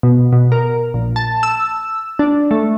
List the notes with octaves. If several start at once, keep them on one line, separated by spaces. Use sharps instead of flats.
B2
B2
A#4
A#1
A5
E6
D4
A3